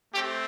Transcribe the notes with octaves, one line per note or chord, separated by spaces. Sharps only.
A3 C4 G4